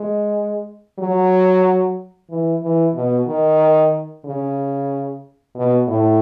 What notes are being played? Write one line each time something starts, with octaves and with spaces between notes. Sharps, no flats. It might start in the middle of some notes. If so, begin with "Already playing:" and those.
Already playing: G#3
F#3
E3
E3
B2
D#3
C#3
B2
A2